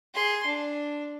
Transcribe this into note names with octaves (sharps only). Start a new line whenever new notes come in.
G#4 C6
D4